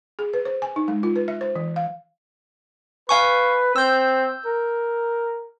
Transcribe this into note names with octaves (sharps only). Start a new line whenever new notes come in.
G#4
B4
C5
G#5
D#4
G#3
F4
B4
E5
C5
E3
F5
B4 F5 G#5 C#6
C4 E6 G6
A#4